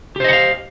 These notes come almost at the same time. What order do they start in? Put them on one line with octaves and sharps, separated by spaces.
G4 C5 D#5 F#5 F5